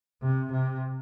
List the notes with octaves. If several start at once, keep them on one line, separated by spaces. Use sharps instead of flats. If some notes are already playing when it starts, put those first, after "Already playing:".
C3
C3